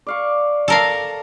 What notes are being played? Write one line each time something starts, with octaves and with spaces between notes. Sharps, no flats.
D5 F5 C#6
A4 A#4 F5 A5